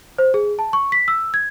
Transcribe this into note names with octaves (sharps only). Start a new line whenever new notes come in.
C5
G#4
A5
C#6
B6
E6
G#6